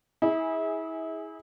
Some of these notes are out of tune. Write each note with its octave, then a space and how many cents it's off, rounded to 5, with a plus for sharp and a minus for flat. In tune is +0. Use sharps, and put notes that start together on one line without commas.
E4 -30 G#4 -5